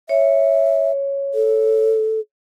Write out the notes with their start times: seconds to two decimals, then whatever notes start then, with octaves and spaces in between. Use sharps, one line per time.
0.09 C#5 E5
1.34 A4